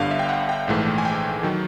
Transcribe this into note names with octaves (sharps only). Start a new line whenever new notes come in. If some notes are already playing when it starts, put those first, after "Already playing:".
Already playing: G1 G2 D3 F5
E5
G5
F#5
G5
A#1 G#2 E3 A3
G#5
G5
D#3 F#3